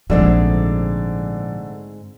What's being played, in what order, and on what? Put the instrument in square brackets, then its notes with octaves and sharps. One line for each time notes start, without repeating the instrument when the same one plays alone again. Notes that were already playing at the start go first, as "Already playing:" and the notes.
[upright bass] A#1 F3 [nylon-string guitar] G#2 G#3 C4 [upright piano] D3 A3 D5